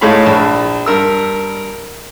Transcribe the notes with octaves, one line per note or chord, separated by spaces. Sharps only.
A2 G#3 A3 C#5 F5 B5
A#1 A5
G2 A#4 E6